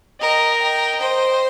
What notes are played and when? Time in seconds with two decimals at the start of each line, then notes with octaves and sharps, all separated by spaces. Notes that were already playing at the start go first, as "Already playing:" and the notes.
0.21 A#4 D#5 G5
0.61 D#5 G5
1.01 C5